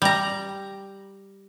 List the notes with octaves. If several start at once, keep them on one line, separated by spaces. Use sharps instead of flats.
G3 A#5